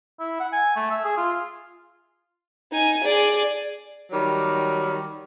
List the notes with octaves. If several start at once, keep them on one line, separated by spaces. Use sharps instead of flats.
E4
F#5
G#5
A3
E5
G#4
F4
D#4 G#5
G#4 D5
D#3 F#3 G3